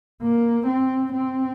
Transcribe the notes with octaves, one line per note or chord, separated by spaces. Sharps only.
A#3
C4
C4